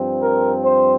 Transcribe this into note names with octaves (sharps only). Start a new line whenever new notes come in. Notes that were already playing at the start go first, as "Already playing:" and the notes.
Already playing: G2 F3 C4
A#4
C5